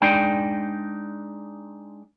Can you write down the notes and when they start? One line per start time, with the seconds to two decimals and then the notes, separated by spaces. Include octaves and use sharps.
0.02 G#3 D4 D#4 G5